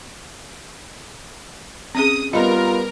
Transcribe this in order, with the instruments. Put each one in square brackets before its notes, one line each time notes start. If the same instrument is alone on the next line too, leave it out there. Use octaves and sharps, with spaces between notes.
[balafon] C4 C#4 G#4 [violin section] D#6
[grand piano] G3 B3 [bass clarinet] F4 [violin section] A#4 [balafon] D#5